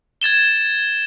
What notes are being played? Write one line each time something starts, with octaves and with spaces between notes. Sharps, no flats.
G#6 A6 E7 G7